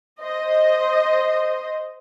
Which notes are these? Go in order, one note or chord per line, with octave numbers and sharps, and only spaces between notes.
C5 D#5